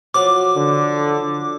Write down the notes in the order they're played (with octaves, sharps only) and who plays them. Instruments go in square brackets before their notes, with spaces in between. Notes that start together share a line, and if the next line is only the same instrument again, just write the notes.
[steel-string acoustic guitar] F3 F#3 F#4 [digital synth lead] D6
[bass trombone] D3